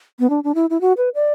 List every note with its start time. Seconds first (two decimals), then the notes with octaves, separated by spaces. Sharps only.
0.19 B3
0.30 D4
0.44 D4
0.55 E4
0.70 E4
0.81 F#4
0.97 B4
1.15 D5